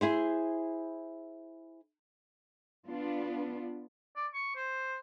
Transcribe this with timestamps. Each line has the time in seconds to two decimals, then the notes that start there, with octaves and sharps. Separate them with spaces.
0.01 E4 G#4 C5
2.88 B3 D4 F4
4.16 D5
4.34 C#6
4.56 C5